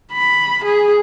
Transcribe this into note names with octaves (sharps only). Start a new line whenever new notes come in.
B5
G#4